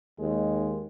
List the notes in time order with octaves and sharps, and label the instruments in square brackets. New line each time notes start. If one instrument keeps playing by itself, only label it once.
[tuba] D#2 [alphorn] G#3